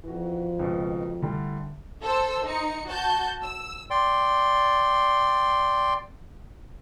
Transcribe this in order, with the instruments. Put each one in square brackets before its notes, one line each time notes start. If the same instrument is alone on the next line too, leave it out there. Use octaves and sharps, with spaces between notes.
[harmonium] F2 [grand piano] E3 F#4
[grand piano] C#2 B2
A2 D3 G3
[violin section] A4 C5 E6
D#4 C#7
F#4 A5 G6
E6
[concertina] D5 G5 C6